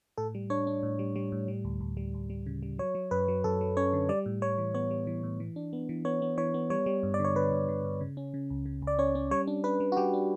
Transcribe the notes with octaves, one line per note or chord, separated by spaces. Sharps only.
A2 A4
G3
D4 C#5
D4
A2
G3
G3
A2
G3
D2
D2
G3
D2
G3
C#3
G3
F#3 C#5
F#3
F#2 B4
F#3
F#2 A4
F#3
C#4 C#5
D3
G3 D5
A2
G3 C#5
E3
B3 C#5
G3
E3
A2
E3
D4
B3
E3
B3 C#5
B3
E3 C#5
B3
G3 C#5
G3
G2
D5
D3
C#5
D3 B4
G2
D3
G2
C#3
C#4
C#3
C#2
C#3
C#2
D5
C#4 C#5
C#4
G3 C#5
D4
D4 B4
G3
F#4
G3 G4
D4